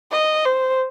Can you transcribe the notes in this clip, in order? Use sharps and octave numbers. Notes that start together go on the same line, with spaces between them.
D#5
C5